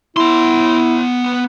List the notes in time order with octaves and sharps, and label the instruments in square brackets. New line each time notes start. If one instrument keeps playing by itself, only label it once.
[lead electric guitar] B3 C6 [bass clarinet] E4